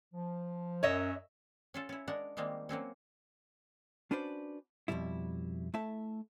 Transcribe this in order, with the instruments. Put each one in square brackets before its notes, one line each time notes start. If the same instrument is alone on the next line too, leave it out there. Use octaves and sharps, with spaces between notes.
[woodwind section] F3
[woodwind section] F#2 [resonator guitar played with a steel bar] C#5 D#5 E5
[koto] C#4 F4 A4
C#4 E4
G#3 D4 A#4 F#5
D#3 G3 G#3 A#3 C4
F#3 A#3 C4 C#4
[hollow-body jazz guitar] C#4 D4 F#4 B4 C5 D5
F2 G#2 B2 G3 E4
A3 E4 E5 A5